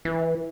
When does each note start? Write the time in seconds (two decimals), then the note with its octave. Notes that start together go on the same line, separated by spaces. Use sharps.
0.05 E3